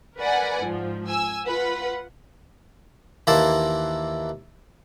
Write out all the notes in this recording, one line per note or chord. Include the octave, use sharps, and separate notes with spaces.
A#4 B4 D5 F#5 G#5
G#2 F3
G#5 E6
F4 B4 F#5
D#2 E3 A#3 E4 C5 A5